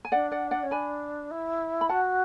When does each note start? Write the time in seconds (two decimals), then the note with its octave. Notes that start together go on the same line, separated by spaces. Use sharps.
0.05 G#5
0.12 D4 D5 F#5
0.31 D5 F#5
0.51 D5 F#5
0.62 C#4
0.71 D4 G#5 B5
1.30 E4
1.81 B5
1.89 F#4 F#5 A5